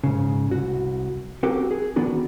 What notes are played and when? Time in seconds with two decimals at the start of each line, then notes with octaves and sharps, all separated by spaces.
0.04 G#2 C#3
0.50 C2 F#4
1.43 C4 F#4 G4 A4 A#4
1.71 G#4
1.96 D#3 B3 D4 F#4 A4